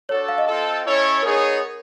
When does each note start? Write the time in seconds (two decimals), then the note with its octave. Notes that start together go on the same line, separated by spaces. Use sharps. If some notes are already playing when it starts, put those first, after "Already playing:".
0.09 D4 F#4 A4 C#5
0.29 F5
0.38 D#5
0.47 C4 F4 A4
0.85 C#4 E4 A4 C#5
1.22 B3 D#4 G#4 A#4 C#5